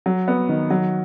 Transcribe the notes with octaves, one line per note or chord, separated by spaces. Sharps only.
F#3
B3
D#3
F#3